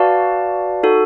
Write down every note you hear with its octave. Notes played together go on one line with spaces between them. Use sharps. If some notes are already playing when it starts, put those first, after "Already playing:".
Already playing: F#4 B4 D5 F5 A5
D#4 F#4 A4